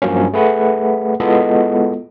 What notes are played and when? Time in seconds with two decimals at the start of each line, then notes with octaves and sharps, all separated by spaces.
0.02 G2 F3 F#3 A#3 C#4
0.33 A3 G#4 B4 F#5
1.20 G#3 B3 E4 F4 A4 D#5